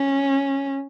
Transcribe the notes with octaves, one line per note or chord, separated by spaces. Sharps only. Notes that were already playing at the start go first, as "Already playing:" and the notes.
Already playing: C#4